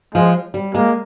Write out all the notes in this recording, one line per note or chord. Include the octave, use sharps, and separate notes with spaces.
F3 G#3
G3
G#3 A#3